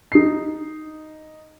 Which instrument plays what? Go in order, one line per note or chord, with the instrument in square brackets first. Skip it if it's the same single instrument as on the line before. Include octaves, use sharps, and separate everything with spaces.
[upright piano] D#4 C7